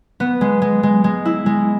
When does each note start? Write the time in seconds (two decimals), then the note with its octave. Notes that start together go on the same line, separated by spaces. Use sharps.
0.20 B3
0.41 G#3
0.62 G#3
0.83 G#3
1.04 G#3
1.25 E4
1.46 G#3